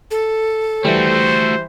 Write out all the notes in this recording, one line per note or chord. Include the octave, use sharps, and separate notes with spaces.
A4
E3 G3 A3 F#4 C5